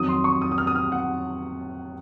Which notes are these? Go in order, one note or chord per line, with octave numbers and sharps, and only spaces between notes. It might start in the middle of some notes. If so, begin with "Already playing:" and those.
Already playing: F2 D#3 F#3 D#6
C6
C#6
D#6
D#6
F6
D#6
F6
F#5